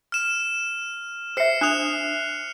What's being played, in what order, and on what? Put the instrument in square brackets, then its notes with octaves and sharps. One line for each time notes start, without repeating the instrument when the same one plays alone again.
[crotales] F6 E7
[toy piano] C5 E5 [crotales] F6 C7 C#7
[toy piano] D4 D#6 [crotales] F#6 F7